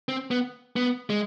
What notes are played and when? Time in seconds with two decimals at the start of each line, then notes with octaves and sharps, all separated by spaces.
0.09 C4
0.31 B3
0.76 B3
1.10 G#3